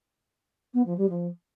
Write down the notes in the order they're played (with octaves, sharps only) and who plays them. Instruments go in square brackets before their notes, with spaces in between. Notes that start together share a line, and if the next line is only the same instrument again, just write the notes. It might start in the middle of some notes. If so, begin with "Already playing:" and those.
[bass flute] B3
F3
G3
F3